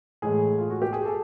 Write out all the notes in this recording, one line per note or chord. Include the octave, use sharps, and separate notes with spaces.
A2 E3 G#3 G#4
F4
F#4
G4
G#4
A4